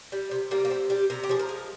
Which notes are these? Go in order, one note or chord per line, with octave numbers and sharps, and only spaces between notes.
G3
C3
G3 A#3
A#3
C3 C4
G3 G4
C3 A#4
G4
F3 G#4
A#4
G#3